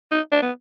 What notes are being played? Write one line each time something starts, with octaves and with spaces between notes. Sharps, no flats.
D#4
D4
B3